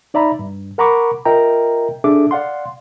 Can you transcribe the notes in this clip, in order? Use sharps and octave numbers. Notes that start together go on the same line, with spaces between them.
D#4 D5 E5 A#5 B5
G2
A#4 F#5 A#5 B5 C#6 D6
F4 A#4 D#5 E5 G5 A#5
D4 G#4 A4 E5 D6
D5 F5 F#5 C6